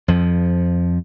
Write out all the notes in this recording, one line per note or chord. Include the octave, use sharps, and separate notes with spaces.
F2 F3